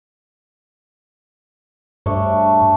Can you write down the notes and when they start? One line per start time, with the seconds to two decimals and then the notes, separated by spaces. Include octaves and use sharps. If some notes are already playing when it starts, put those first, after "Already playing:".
2.06 G2 A3 D4 C#5